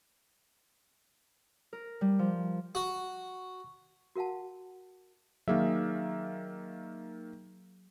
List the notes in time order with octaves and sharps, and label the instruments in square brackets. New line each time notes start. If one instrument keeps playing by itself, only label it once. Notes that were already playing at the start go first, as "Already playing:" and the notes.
[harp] A#4
G3
F3
[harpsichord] F#4
[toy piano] F#4 A#4 F5 F#5 A5
[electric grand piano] D#3 A#3 E5 [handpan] F#3 G#4 F5